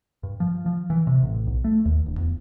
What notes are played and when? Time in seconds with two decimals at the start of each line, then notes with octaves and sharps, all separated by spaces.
0.23 G2
0.40 F3
0.66 F3
0.90 E3
1.07 C3
1.22 A1
1.47 B1
1.64 A3
1.85 D#2
2.06 D1
2.18 E2